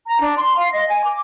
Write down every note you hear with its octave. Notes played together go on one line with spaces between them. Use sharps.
A#5
D4
C6
F5
D#5
G#5
D6